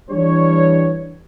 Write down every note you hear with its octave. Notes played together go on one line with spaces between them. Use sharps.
E3 G3 D4 C#5